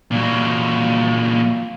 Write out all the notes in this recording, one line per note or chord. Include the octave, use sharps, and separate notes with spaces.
A#2 F#3